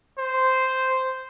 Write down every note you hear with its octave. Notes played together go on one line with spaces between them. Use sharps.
C5